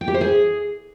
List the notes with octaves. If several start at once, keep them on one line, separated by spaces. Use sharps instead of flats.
G5
G4
C5
G#4